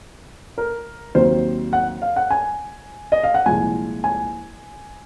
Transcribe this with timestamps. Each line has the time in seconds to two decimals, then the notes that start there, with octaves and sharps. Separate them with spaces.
0.58 A#4
1.15 D#2 D#3 F#3 C4 C5
1.73 F#5
2.02 F5
2.16 F#5
2.31 G#5
3.12 D#5
3.24 F5
3.34 F#5
3.46 C2 A#2 F3 G#3 G#5
4.04 G#5